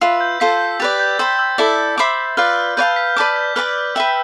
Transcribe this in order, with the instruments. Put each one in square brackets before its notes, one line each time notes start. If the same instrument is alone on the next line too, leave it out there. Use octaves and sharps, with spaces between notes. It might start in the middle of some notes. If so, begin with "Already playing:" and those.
[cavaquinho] F4 B4 E5 [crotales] E6
[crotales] G6
[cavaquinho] F4 A4 C5 [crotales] B6
[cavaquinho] G4 B4 D5 [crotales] A6
[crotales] G6
[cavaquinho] C5 G5 B5 [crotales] E6
[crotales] E6
[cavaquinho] E4 A4 D5
C5 E5 B5 D6
[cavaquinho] F4 B4 D5 [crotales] F6
[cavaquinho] B4 D5 F5 A5 [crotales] G6
[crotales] B6
[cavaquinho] B4 D5 A5 D6
[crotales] G6
[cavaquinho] B4 D5 A5 D6 [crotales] F6
[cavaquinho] B4 E5 G5 [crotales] E6